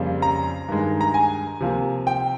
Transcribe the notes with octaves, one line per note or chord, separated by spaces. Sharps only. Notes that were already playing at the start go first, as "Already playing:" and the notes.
Already playing: F2 C#3 G3 A#3
A#5
G2 D#3 G#3
A#5
G#5
C3 F3 A#3
G5